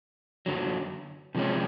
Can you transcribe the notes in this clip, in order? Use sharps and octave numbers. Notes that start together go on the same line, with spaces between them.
F#2 D3 F#3
C3 F3 G#3 C#4